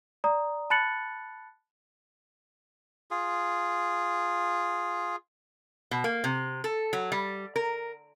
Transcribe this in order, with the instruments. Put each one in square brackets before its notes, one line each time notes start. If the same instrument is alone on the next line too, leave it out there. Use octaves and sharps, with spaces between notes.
[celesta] D5 A#5 D#6
A5 B5 F#6 A6 C#7 F#7
[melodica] F4 G#4
[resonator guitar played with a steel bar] B2
A#3
C3
A4
F#3
G3
A#4